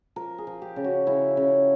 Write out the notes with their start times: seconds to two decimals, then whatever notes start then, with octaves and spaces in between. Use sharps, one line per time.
0.16 F3 A#4
0.38 G#4
0.47 F3
0.62 G4
0.76 C#3
0.84 F#4
1.07 C#3 E4
1.37 C#3